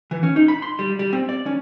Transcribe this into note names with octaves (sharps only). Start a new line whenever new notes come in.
E3
C#4
D#4
B5
C6
G3
G3
C4
D5
C#4